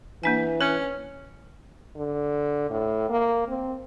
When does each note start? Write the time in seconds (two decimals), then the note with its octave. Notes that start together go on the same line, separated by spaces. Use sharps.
0.23 E3 A#3 D4 G#5
0.61 C#4 B4
1.97 D3
2.70 A2
3.10 A#3
3.48 C4